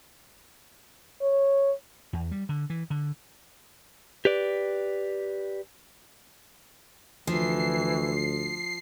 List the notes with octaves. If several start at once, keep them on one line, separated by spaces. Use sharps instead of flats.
C#5
E2
G3
D3
E3
D3
G4 B4 D5
D2 E3 F3 C7